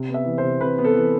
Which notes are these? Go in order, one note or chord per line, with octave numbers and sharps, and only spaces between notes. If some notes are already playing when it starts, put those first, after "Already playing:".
Already playing: C3
B3
E5
E3
C5
C3
C3 B4
B3
A4
E3